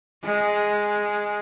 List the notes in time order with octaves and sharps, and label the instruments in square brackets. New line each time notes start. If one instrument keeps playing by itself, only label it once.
[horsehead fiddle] G#3